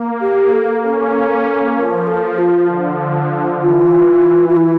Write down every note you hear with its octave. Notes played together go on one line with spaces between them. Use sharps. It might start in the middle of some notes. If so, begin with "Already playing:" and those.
Already playing: A#3
G4
A4
C#4 A4
F3 A#4
A4
F4
D3
E3 F4
F4
E4